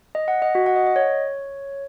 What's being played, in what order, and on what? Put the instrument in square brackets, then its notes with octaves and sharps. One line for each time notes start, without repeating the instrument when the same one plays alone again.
[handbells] D#5
F#5
D#5
F#4
F#5
D#5
D#5
C#5